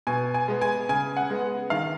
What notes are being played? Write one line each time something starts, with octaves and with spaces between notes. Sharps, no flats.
B2 G#5
G#5
G#3 B3
G#5
C#3 G#5
F#5
G#3 B3
D#3 F5